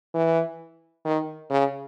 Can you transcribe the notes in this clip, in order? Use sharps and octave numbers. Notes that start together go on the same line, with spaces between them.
E3
D#3
C#3